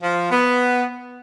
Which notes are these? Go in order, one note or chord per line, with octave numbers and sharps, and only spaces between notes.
F3
B3